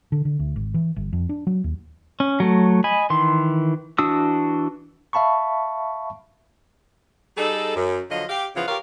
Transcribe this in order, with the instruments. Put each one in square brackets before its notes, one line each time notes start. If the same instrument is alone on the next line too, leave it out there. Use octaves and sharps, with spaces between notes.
[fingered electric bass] D3
D3
D2
G#1
E3
G1
F2
D4
F#3
D#2
[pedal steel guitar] C#4
F#3 A3
D#5 G#5 B5
D#3 E3 C6
E3 D4 F#4 D#6 E6
[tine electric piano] E5 F5 A5 B5 C#6
[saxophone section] G3 D#4 G#4 A4
F#2
D3 F3 F#3 F4 D#5
G4 F5
C#3 E3 F3 B3 F4
F4 G4 A#4 C#5 F5